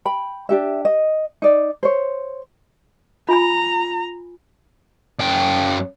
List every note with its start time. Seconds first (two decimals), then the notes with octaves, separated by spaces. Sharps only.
0.05 G5 B5
0.49 D4 G4 E5
0.85 D#5
1.42 D#4 D5
1.83 C5 C#5
3.29 F4 G#5 A#5 B5
5.20 F#2 G5